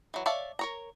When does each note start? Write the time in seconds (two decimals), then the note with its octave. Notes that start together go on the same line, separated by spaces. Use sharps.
0.14 E3 F#3
0.26 C#5 D5 E5 F5 A5
0.59 A#4 C#5 A#5